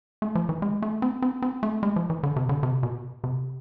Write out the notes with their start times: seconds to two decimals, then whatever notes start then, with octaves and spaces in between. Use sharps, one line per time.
0.22 A3
0.35 F3
0.49 E3
0.62 G#3
0.82 A3
1.02 C4
1.22 C4
1.42 C4
1.63 A3
1.83 G#3
1.96 F3
2.10 E3
2.23 D3
2.36 C3
2.49 D3
2.63 C3
2.83 B2
3.24 C3